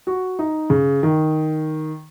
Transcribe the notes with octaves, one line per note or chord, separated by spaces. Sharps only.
F#4
D#4
C#3
D#3